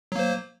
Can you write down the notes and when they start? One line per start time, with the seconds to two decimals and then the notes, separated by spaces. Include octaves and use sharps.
0.12 F#3
0.15 A#3
0.19 C5